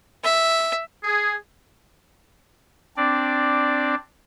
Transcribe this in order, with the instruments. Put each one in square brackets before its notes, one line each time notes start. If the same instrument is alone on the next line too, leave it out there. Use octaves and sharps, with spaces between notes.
[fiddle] E5
[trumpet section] G#4
[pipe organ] C4 D4 D5